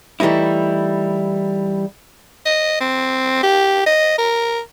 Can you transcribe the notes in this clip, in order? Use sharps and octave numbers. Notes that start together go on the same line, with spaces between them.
E3 G3 A3 D#4 E4
D#5
C4
G4
D#5
A#4